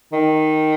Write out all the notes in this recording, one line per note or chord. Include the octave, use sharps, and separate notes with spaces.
D#3